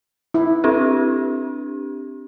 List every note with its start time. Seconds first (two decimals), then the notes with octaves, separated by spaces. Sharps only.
0.34 E4
0.64 C4 D4 G4